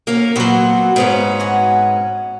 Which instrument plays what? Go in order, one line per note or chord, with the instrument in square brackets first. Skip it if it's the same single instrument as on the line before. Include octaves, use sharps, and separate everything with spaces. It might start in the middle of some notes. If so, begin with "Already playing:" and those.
[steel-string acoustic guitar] A#3 C#4 [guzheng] A#4 F5
[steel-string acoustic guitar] A#2 F#3 [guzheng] B3 C4 F#4
[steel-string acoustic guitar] G#2 B3 C#4 [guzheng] F5
[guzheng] F#4 G#5